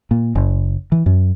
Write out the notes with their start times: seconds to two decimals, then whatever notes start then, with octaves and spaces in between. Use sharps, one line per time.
0.11 A#2
0.35 F#1
0.92 E3
1.06 F#2